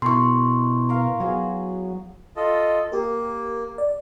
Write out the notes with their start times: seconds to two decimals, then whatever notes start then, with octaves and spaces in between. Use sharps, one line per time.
0.02 B2 E4 A#4 C6 C#6
0.89 A#4 F5 A#5
1.20 F#3 B3 F#4 G#4
2.36 F4 A4 D#5
2.92 A#3 G4 A#4
3.78 D5